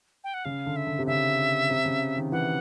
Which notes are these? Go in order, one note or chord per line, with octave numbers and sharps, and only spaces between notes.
G5
F#5
C#3 F5
D3
E5
D3
C3
C#3 E5
C3
C#3
D#3
E3 F#5